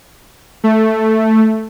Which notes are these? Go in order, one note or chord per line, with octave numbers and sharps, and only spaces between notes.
A3